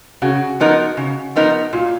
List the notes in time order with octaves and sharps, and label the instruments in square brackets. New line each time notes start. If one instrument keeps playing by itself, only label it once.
[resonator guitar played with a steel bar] C#3 [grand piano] F#4
[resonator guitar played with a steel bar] F3 B3 D#4 A#4
C#3
F3 B3 D#4 A#4
[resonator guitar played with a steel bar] A#2 [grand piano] F4